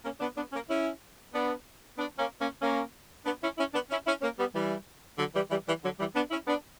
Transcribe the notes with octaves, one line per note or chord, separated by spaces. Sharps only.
A#3 C#4
B3 D4
B3 D4
A#3 C#4
C#4 E4
B3 D4
B3 D4
A#3 C#4
A#3 C#4
A#3 C#4
B3 D4
C#4 E4
C#4 E4
B3 D4
C#4 E4
C#4 E4
A#3 C#4
G3 B3
E3 G3
D3 F#3
E3 G3
E3 G3
E3 G3
D3 F#3
E3 G3
B3 D4
C#4 E4
B3 D4